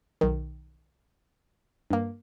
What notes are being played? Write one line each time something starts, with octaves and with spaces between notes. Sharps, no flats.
B1 D#3
G2 A#3